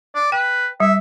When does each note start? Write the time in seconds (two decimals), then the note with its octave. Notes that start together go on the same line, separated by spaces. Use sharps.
0.15 D5
0.32 B4 G5
0.80 G3 E5